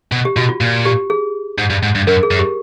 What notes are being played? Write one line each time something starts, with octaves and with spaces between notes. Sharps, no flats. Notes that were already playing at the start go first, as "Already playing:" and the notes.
B2
G4
B2 F#4
F4
A#2
G4
G#4
G#2
G2
G#2
G2
F#2 A#4
G#4
F#2
G4